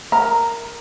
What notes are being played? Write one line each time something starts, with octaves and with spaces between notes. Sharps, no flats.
A#4 A#5